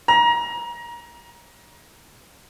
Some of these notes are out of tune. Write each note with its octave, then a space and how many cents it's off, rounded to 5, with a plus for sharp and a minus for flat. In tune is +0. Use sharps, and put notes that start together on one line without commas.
A#5 +25